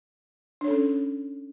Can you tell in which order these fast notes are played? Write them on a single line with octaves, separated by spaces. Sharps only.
D4 C#5 A4 C#4